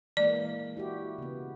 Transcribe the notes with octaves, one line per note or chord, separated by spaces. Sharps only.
E3 G#3 A#3 D5
E4 F#4 G4
C#3 B3